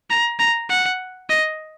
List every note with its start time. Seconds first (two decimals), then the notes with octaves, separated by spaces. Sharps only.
0.10 A#5
0.39 A#5
0.69 F#5
1.29 D#5